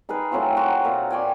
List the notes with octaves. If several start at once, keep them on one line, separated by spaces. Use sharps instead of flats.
D#4 G#4 A#4 B4
A2 F#3 C4 F4
F#4 A#5 C6
A#2
C#5 D5 G5 G#5